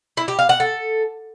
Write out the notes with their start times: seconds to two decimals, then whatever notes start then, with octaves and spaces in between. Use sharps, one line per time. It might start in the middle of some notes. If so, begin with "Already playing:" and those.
0.17 E4
0.28 G4
0.39 F5
0.49 F#5
0.60 A4